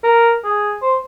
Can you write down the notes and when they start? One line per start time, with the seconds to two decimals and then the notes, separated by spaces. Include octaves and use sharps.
0.04 A#4
0.44 G#4
0.82 C5